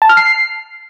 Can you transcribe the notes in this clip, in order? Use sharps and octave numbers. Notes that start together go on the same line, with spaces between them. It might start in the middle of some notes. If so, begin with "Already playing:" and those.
A5
F6
C7